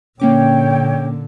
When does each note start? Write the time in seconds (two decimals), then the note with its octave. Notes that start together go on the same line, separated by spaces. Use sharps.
0.20 A#2 D3 A#3 C#4 C#5 G5 D6